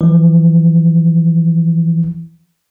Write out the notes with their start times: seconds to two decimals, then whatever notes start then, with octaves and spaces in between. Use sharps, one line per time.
0.01 E3 F3